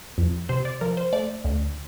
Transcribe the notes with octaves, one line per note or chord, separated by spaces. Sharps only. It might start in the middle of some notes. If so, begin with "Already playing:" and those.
F2
C3 C5
D5
F3 A#4
C5
A3 D5
D2